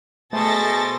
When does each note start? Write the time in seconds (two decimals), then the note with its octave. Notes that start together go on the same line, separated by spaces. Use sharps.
0.33 B2 A3 G#4 A4 C5 A6 A#6